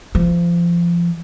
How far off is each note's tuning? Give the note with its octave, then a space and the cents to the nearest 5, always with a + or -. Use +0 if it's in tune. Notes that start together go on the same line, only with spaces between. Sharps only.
F3 -25